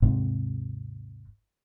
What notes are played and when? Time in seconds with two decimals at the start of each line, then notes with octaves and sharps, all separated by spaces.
0.02 G#1 D#2 G#2 C3